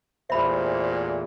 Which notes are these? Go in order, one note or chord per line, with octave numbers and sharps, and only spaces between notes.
A1 E2 A#2 C5 E5 B5